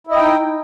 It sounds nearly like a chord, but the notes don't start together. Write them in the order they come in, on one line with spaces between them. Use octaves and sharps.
E4 D#5 G5 D#4